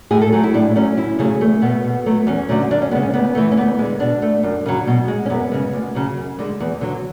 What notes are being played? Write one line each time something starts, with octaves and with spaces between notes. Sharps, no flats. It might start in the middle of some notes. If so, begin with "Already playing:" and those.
A2 G#4
A4
F#3 A3 G#4
E4
A2 D4
F#3 A3 C#4
D2 E4
C#3 F#3 A3 G#4
E2 A3
B2 A3 B3
B2
F#3 A3
E2 C#4
D3 F#3 A3
F#2 D4
C#4
C#3 G#3 B3
C#4
D2 B3
C#3 E3 A3
C#4
D2 B3
D3 G#3
B2 D4
A3
F#2
C#3 F#3
B2
G#3
C#4
F#2 B3
C#3 G#3
D2
C#3 F#3
F#2
D3 G#3
E2
D3 F#3